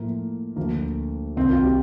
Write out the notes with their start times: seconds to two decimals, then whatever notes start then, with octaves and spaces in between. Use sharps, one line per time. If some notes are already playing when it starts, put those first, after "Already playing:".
Already playing: A2 F3 A#3
0.56 D2 D3 F3 A#3
1.36 C2 C3 D#3 C4
1.50 F4
1.63 G4